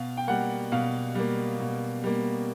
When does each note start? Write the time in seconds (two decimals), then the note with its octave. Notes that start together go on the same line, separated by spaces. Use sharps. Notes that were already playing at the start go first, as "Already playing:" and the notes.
Already playing: B2 F5
0.17 G5
0.28 G3 A#3 F#5
0.72 B2 F5
1.15 G3 A#3
1.60 B2
2.04 G3 A#3